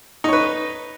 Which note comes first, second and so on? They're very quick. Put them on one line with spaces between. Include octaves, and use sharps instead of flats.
D#4 C#5 B4